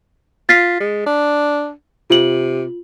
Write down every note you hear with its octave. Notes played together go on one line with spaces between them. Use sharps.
F4 A6 B6 C7
G#3
D4
C3 F4 F#7